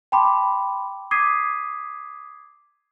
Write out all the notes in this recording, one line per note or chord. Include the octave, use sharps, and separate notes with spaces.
G5 A5 B5 C6 D6
D6 D#6 G#6 B6 C7 D#7